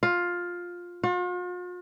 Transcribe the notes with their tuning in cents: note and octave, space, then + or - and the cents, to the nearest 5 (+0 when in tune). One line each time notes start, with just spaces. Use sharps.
F4 +10
F4 +45